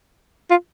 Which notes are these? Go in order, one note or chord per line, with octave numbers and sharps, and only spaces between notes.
F4